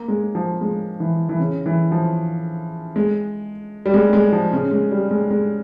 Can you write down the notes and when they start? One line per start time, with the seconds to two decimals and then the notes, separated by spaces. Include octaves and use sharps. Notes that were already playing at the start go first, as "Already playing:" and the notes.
Already playing: A#3
0.08 G#3
0.35 F3
0.61 G#3
1.00 E3
1.29 E3
1.39 C#3
1.66 E3
1.92 F3
2.96 G#3
3.86 G3
3.94 G#3
4.13 G#3
4.32 F3
4.53 C#3
4.71 G#3
4.91 G3
5.11 G#3
5.31 G#3